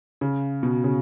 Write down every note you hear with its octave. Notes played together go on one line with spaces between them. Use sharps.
C#3
B2
C#3